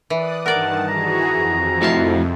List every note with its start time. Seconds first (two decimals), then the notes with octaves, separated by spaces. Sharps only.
0.10 E3 D5 D#6 F#6
0.46 G2 D#3 A#4 D5 F#5 A5
0.88 E3 F#4 G#4 A#5
1.28 F2
1.81 A2 C3 E4 F#4 F5 A5